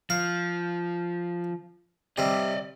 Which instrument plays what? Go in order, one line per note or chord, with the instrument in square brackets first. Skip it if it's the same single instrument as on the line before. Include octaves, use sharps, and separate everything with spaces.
[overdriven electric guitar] F3 [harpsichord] F5
[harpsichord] C3 G3 [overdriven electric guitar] D5 D#5